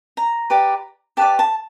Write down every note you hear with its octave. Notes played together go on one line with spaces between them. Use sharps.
A#5
G4 B4 D5
G4 B4 D5 A5
A5